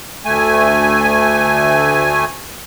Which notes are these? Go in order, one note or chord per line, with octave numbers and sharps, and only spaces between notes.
D2 A3 G#5